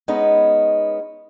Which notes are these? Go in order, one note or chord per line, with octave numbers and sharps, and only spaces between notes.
G#3 B3 C#4 D#4